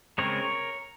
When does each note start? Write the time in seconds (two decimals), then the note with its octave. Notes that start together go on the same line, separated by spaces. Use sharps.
0.18 C#3 G#3 C4 A#4 C#5